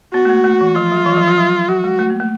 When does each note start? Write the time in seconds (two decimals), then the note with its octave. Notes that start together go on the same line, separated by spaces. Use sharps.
0.13 B3 F#4
0.25 A3
0.29 A#3
0.44 A3
0.61 E3
0.75 F3 F4
0.92 F#3
1.06 E3
1.12 F#3
1.17 F3
1.28 F3
1.38 F#3
1.52 F#3
1.69 F#3 F#4
1.84 G#3
1.99 A3
2.10 A#3
2.20 A3